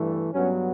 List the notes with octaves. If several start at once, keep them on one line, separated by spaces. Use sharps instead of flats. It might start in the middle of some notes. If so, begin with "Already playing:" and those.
Already playing: G2 E3 A3
G2 F#3 B3 C#4